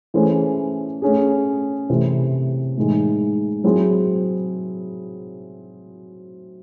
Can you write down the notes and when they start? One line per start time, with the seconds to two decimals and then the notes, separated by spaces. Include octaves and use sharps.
0.14 E3 A3 C#4 G#4 C5
1.02 A3 C#4 G#4
1.89 C3 E3 A3 C4
2.77 A2 E3 G#3 D#4
3.64 F#3 C4 E4 G#4 C5